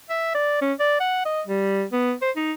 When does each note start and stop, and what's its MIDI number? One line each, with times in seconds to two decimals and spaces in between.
0.09 0.31 76
0.34 0.60 74
0.61 0.72 61
0.79 1.00 74
1.00 1.21 78
1.25 1.41 75
1.47 1.84 55
1.92 2.13 59
2.22 2.31 72
2.36 2.52 63